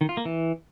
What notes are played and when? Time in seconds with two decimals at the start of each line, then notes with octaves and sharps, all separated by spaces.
0.01 D#3
0.09 F4
0.17 A#3
0.25 E3